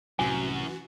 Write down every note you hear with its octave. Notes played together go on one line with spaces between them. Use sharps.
C2 F#2 A2 C3 E3 F#4 G#5